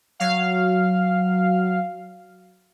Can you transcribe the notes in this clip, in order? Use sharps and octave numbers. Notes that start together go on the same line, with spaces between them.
F#3 F5